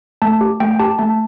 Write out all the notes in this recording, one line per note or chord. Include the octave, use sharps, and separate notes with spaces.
A3 A5
G4
A3 G5
G5
G4 A5
A3 A5